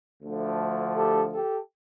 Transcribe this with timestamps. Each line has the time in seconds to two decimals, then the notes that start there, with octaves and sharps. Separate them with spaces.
0.22 D2 D3 F3 A3
0.95 G4 A4
1.32 G4 A4